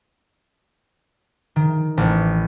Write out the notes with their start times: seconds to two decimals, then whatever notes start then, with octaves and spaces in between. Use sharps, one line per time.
1.56 D#3
1.97 A1